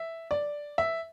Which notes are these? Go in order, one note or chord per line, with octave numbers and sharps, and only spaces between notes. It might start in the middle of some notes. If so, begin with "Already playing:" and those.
Already playing: E5
D5
E5